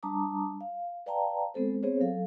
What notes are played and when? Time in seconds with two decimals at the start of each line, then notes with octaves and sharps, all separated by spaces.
0.03 G3 D4 A5 A#5 D6 D#6
0.61 F5
1.06 B4 D5 F5 G5 A5 A#5
1.54 G#3 B3 C4 A4 C5
1.83 B3 C4 G#4 C5 C#5
2.01 F#3 A4 F5